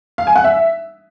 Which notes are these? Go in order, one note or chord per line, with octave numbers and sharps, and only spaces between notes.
F5
G#5
F#5
E5